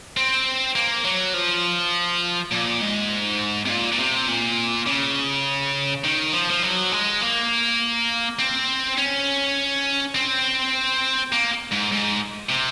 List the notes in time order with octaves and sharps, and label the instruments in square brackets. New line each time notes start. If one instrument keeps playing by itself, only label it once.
[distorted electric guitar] C4
A#3
F#3
F3
A#2
G#2
C3
A#2
A#2
C3
A#2
C#3
D#3
F3
F3
F#3
G#3
A#3
C4
C#4
C4
A#3
G#2
G#2
C3